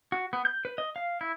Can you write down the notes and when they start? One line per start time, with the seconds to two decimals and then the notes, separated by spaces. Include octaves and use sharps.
0.12 F#4
0.33 B3
0.45 G6
0.65 B4
0.78 D#5
0.96 F5
1.21 E4